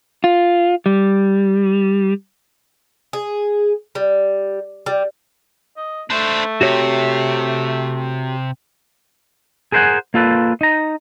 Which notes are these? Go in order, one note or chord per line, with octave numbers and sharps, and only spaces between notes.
F4
G3
G#4
G3
G3
D#5
A3 D4 C5
C3 F#4 G4 C#5
G#4 A#4 C5 D#5 F#5 G#5
A#3 F4 A4 B4
D#4 A#5